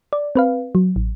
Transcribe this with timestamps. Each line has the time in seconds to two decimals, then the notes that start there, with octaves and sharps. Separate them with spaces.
0.13 D5
0.35 C4 B4 F5
0.75 F#3
0.96 A1